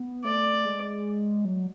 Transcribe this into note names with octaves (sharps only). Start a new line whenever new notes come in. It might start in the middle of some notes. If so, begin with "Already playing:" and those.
Already playing: B3
A3 D5
G#3
F#3